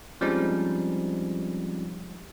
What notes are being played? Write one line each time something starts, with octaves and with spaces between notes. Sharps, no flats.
F3 G3 G#3 C4 C#4 D#4